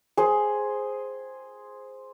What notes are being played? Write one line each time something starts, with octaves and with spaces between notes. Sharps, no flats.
G#4 C5